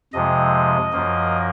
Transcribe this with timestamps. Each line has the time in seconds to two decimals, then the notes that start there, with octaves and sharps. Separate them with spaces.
0.13 F2 C3 F3 G#3 D#5
0.92 F#2 F3 A#3